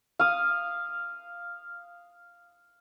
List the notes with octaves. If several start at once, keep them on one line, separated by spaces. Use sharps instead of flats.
F5 D#6